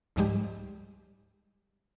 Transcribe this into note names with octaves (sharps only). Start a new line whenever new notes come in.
C#2 G#2 F3 G3 G#3 G4